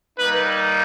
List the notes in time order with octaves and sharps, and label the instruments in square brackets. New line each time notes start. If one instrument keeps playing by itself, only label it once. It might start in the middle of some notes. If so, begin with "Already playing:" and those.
[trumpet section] G3 A#3 D#4 B4